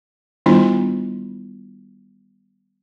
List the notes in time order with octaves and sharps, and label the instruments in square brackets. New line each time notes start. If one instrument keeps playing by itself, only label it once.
[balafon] D#3 G3 B3 D4 E4 F4